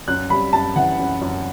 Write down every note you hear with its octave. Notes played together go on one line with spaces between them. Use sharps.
F#2 F#6
G3 B5
F#2 A5
E3 F#5
F#2
F#2